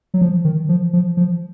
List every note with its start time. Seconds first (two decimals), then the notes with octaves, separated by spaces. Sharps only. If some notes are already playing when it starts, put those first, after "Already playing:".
0.14 F#3
0.21 F3
0.45 D#3
0.69 F3
0.93 F3
1.17 F3